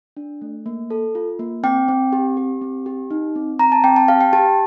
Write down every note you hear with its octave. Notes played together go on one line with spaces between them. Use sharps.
D4
A3
A#3
A4
F4
A#3
C4 G5
C4
G4
G4
C4
G4
D#4
C4
C4 A#5
A5
C4 G5
A5
G4 F5
G5
G4 A5